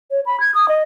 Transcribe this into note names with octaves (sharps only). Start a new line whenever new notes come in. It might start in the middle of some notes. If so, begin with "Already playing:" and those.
C#5
B5
G#6
D#6
D#5